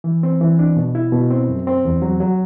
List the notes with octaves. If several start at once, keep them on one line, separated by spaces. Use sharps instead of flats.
E3
C4
E3
D4
B2
E4
B2
C4
F#2
C4
E2
F#3
F#3